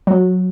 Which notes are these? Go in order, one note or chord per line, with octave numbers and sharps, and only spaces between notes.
F#3